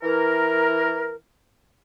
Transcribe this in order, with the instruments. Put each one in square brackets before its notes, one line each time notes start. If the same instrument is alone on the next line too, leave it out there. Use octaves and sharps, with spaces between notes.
[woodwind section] E3 A#4